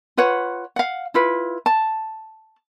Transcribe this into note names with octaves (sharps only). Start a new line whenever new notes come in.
F4 B4 C#5 F#5
F5 F#5
E4 F4 B4
A5